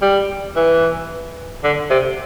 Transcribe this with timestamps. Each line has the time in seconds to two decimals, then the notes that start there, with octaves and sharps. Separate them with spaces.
0.02 G3
0.56 E3
1.64 D3
1.90 C3